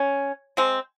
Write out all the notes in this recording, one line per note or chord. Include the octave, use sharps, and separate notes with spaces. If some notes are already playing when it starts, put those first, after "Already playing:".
Already playing: C#4
G#3 C4